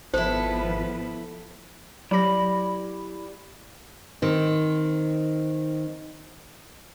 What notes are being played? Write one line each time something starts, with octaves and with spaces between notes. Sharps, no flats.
G#1 F3 B3 E4 A4 B4 C5
F#3 E4 G4 D5 B5 A#6
D#3 C4